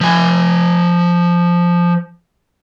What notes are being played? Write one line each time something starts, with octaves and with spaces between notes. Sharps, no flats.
F3 G#5